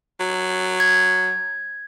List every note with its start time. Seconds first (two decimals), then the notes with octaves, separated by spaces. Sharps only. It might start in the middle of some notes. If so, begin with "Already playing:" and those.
0.20 F#3
0.80 G#6